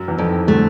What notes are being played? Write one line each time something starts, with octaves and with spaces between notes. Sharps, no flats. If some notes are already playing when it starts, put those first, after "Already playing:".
Already playing: F#2 F#3
E2 E3
F2
D#3
D3 A3